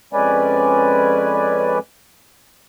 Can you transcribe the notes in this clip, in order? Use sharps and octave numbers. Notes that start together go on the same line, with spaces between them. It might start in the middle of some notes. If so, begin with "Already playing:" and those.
F2 G#3 C#4 B4 D5 G#5